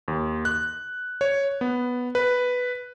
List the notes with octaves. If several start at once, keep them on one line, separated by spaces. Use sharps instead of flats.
D#2
F#6
C#5
B3
B4